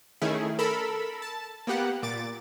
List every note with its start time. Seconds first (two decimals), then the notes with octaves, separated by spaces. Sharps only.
0.22 D#3 A3 C#4 E4 G#4
0.59 A4 A#4 B5 E6
1.22 A5
1.67 A#3 B3 G4 F#5
2.03 A#2 D6 A6